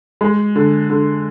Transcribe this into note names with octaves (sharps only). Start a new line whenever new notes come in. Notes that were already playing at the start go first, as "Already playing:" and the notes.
G#3
D3
D3